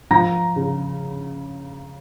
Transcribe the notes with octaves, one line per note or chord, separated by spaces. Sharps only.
F3 A#5 A#6
C#3